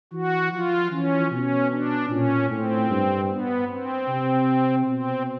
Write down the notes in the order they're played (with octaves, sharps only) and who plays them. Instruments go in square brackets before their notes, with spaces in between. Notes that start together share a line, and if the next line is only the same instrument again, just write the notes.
[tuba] E3 [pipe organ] F#4
[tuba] F3 [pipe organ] F4
[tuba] E3 [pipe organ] C#4
[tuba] B2 [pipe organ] C#4
[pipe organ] D4
[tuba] A#2 [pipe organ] C#4
[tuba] A2 [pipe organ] C4
[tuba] G2
[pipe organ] B3
C4
[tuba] C3
[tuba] B2 [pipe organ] C4